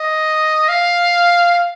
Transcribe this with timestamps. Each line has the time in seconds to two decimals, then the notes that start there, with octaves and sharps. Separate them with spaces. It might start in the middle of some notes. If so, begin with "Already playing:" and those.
Already playing: D#5
0.69 F5